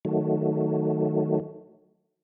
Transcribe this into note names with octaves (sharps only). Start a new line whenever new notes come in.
D#3 F#3 A3